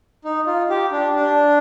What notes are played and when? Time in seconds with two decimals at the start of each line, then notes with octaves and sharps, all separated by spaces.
0.25 D#4
0.46 F4
0.70 G4
0.92 D4
1.15 D4